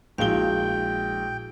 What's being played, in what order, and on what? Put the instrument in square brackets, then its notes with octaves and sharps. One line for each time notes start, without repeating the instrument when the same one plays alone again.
[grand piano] A#1 G#3 G7 [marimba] E4 F#4 F5 [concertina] G5